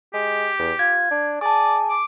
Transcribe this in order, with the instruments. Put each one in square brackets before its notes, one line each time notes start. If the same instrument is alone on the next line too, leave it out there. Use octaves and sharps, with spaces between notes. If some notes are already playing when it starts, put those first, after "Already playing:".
[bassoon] G#3 [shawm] G4
[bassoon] E2
[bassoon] F4 [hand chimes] G#6
[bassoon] D4
[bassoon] G#4 [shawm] D5 [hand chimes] A5 D6
[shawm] D6